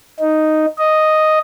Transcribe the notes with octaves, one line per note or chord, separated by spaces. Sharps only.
D#4
D#5